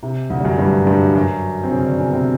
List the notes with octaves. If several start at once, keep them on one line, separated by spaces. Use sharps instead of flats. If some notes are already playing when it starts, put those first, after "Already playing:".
C3
D2 D3
G3
F#2 F#3
G2 G3
G2 G3
F#2 F#3
C4
C#3 C#4
D3 D4
C#3 C#4
B3
C3 C4